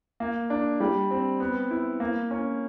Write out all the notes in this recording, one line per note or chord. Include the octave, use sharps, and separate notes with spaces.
A#3
D4
G3
C4
B3
E4
A#3
C#4